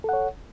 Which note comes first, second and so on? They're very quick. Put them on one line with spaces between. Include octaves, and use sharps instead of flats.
A4 F#5 C#5